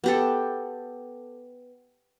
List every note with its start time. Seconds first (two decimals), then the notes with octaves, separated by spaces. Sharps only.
0.04 B3 G4 A4